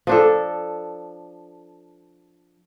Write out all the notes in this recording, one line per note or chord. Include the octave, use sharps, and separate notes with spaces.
F3 D4 A4